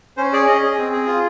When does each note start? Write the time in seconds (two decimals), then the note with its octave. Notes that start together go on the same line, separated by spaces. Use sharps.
0.17 C#4 C5
0.33 G#4 D5
0.47 C#4 D#5
0.63 G#4
0.78 C4
0.92 G#4
1.07 F4